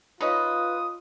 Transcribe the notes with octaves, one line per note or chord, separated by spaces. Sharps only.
D#4 F4 B4 C#5 D#5 D#6